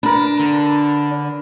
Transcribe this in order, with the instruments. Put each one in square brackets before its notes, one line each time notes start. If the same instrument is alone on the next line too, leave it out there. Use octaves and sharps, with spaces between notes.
[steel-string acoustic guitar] D4 [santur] A#4 B4
[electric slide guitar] D3